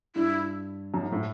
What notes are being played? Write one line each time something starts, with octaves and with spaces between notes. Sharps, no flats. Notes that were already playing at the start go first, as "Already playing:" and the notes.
G2 E4
F#2
G#2
A2